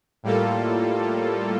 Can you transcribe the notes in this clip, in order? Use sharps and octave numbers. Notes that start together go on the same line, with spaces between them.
A2 G3 A#3 F4 A4